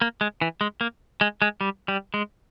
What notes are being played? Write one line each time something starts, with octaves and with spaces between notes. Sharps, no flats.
A#3
G#3
E3
G#3
A#3
G#3
G#3
G3
G3
G#3